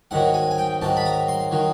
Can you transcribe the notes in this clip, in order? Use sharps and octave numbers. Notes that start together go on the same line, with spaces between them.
G#2 D#3 F#3 F#5
G#5
G#5
G5
G#2 D#3 F#3 A5
B5
A#5
C6
D#3 F#3